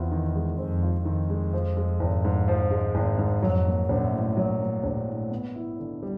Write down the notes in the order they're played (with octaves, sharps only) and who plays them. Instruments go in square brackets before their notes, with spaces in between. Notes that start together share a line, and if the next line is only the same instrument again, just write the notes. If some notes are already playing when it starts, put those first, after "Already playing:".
Already playing: [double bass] E2 [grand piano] C4 F4
[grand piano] D#3
G#3
[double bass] F2 [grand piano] C4
[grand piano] F4
[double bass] F2 [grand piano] D#3
[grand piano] G#3
F3
G#3
G#1
G#2
F3
G#3
G#1
G#2
[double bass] F2 [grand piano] F#3
[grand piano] A#3
[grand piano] A#1 [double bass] F#2
[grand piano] A2
F#3
A#3
A#1
A2
B3
E4
D3
G3